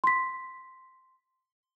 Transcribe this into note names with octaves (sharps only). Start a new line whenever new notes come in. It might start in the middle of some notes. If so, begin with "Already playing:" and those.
C6 B6